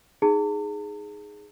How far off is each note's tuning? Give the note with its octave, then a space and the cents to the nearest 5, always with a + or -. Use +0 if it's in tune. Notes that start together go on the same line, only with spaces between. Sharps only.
D#4 +0 G#4 +0 A5 +45